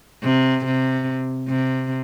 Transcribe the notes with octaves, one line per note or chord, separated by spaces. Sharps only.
C3
C3
C3